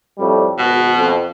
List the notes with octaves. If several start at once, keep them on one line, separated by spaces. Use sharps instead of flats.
F2 A2 G3
G#1 B2
F2